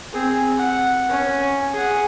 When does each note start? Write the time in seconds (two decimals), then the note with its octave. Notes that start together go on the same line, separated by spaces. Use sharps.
0.12 C4 G#4
0.57 F#5
1.09 C#4
1.73 G#4 F#5